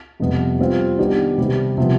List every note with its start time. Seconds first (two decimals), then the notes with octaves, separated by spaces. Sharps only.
0.20 F2 C3 G3 B3
0.59 G3 C4 F4
0.98 D#3 B3 D4 G4 D5
1.38 C3 G3 C4 G4
1.78 C3 F3 B3